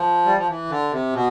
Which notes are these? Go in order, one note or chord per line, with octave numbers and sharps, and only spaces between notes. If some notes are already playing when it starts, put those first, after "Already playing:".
Already playing: F3
G3
F3
E3
D3
C3
B2